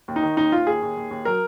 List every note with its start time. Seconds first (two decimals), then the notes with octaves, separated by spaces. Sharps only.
0.08 D#2
0.16 D#4
0.23 D#3
0.37 D#2 D#4
0.52 D#2 F4
0.67 D#2 G#4
0.82 D#2
0.97 D#2
1.11 D#2
1.25 F#3 A#4